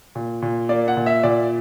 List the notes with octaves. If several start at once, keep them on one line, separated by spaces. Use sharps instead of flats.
A#2
A#2
A#3 D5
F#5
A#2
E5
A#2 D5